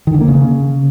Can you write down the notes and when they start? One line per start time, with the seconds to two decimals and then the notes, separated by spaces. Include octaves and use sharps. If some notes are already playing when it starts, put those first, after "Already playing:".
0.07 D#3
0.14 D3
0.21 A#3
0.28 C#3